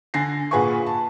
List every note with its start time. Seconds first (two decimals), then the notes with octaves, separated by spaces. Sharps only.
0.14 D3 G#5 A#6 C7
0.51 A#2 G#4 B4 F#5 G#5 C#6
0.87 A5